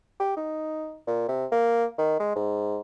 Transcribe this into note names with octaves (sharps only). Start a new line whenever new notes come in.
G4
D#4
A#2
C3
A#3
D#3
G#3
G#2